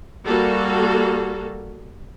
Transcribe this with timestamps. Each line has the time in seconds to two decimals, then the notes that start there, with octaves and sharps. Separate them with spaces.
0.25 G3 A#3 F#4 A4